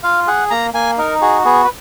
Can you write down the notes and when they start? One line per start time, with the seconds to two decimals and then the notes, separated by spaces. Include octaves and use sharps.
0.03 F4 F5
0.27 G#4 F#5
0.50 A#3 A#5
0.74 A#3 G#5
0.98 D#4 A#4
1.22 F#4 G#4
1.45 B3 G#4
1.64 B4